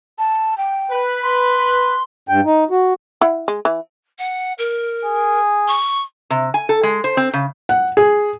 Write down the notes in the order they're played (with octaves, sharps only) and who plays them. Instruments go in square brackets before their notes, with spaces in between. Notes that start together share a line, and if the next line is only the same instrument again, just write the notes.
[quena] A5
G5
[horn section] B4
[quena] C6
[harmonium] G2 G5
D#4
F#4
[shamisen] E4 F#5
G#3
E3
[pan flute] F#5
A#4
[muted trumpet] G#4
[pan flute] C#6
[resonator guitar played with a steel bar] C3
G#5
A4
G#3
C5
C4
C#3
[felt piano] F#5
G#4